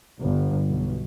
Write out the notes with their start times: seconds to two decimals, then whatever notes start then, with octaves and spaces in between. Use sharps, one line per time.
0.21 G1
0.69 B1